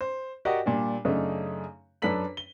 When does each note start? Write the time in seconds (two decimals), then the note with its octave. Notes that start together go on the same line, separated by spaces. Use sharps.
0.01 C5
0.45 F#4 G4 A#4 D5 D#5 F#5
0.66 A#2 G3 D4
1.05 F#2 C#3 A3 D4 D#4
2.02 F#2 D4 A4 B4 B6 F#7
2.37 G7